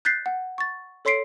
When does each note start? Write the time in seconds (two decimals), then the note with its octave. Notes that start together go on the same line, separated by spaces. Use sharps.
0.05 F#6 G6 A6 B6 C7
0.26 F#5
0.58 C#6 A6
1.05 A4 C#5 C6 B6 C7 D7